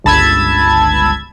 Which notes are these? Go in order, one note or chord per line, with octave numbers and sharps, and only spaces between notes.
G1 C#2 A5 B5 E6 G#6